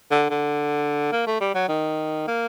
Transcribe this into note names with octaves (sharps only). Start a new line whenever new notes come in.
D3
D3
A#3
A3
G3
F#3
D#3
A#3